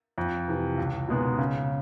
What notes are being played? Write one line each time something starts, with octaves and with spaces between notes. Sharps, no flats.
F2
C3 E3
C#2
B2 G#3 B3 D#4
C#3